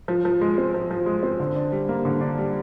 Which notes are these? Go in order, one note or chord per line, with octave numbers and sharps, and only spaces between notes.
F3
F3
G#3
C4
F3
F3
G#3
C4
D3
D4
G3
A#3
D3
D4
G3